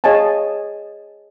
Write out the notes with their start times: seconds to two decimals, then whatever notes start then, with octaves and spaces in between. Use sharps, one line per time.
0.04 G#4 C#5 D#5 F5 G#5 A5